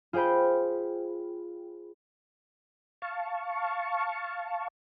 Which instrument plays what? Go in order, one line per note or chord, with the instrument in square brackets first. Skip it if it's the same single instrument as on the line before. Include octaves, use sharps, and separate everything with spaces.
[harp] F4 G#4 C5 G5 B5
[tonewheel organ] F5 A5 C#6